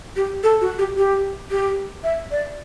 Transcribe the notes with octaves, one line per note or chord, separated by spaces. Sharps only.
G4
A4
F#4
G4
G4
G4
E5
D5